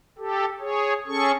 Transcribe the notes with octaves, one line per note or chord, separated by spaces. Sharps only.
G4 A4
G#4 C#5
C#4 G#4 A4 C#6